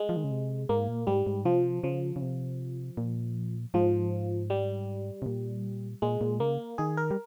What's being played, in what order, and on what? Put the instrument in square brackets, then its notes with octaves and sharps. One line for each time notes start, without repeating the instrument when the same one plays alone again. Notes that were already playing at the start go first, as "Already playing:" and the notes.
Already playing: [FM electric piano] G#3
[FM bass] F3
D#3
C#3
C3
[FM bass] G#2 [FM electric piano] A#3
[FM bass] A#2
[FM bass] G#2 [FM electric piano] G3
[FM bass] G#2
[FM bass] C3 [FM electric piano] F3
[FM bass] C#3 [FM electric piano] F3
[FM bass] C#3
C3
A#2
[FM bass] G#2 [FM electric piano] F3
[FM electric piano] G3
[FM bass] C3
A#2
[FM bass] A#2 [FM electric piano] G#3
[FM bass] A#2
[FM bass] C#3 [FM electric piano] A#3
[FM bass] D#3 [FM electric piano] G#4
[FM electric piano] A#4
[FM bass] G3